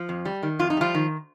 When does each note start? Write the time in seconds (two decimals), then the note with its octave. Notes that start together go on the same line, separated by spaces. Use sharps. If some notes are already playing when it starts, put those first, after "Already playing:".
Already playing: F3
0.09 F2
0.25 G3
0.43 D#3
0.59 F2 F4
0.70 D#4
0.77 F3 G3 F4
0.95 D#3